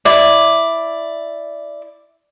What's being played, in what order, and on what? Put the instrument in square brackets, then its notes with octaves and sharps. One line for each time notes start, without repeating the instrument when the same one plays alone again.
[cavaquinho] E4 D5